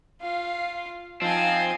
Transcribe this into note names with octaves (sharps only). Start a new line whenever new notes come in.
F4 F5
F3 C4 D#4 F5 G#5 A5